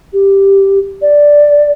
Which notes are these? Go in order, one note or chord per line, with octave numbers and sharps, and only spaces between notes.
G4
D5